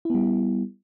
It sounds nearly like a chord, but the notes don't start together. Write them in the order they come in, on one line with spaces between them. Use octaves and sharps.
E4 B3 G3